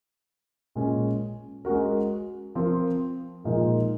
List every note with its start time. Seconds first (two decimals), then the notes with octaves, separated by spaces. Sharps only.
0.75 A#2 G#3 C#4
1.65 G#3 C#4 F#4 A#4
2.55 F3 C4 F4 A#4
3.44 A#2 F3 G#3 D#4 A#4